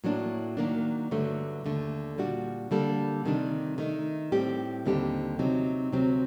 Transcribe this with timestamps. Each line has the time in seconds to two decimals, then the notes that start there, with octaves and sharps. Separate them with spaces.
0.04 A2 F#3 A#3 D4
0.57 D#3 F#3 A#3 D4
1.11 G2 D3 F#3 A3
1.64 D#2 D3 A3
2.18 A#2 G3 D4 F#4
2.71 D3 G3 A#3 D4 A4
3.25 C3 D#3 G3 D4
3.78 D#3 A3 D#4
4.32 A2 G3 C4 G4
4.86 D#2 D3 G3 C4 G4
5.39 C3 F#3 C4 D#4
5.93 D2 C3 F#3 C4